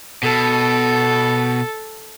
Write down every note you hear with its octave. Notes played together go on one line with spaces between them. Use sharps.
B2 A4